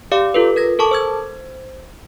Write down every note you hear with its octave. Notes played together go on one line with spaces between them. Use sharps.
G4 D5 F5 D6
F4 A4 B4
A#4 G#6 A#6
A4 A#4 A5 C#6 D6
C5 E6 G#6